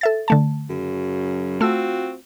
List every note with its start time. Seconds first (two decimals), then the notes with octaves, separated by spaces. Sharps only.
0.01 A4 E5 A6
0.28 D3 A3 A5
0.69 F#2 C#3 F#3
1.61 A3 C4 F4 F#4 E6